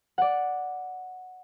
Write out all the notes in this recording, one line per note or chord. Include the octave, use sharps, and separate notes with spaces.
D5 F#5